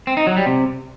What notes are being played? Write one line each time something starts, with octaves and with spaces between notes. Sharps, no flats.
C4
D#4
F#3
G3
C3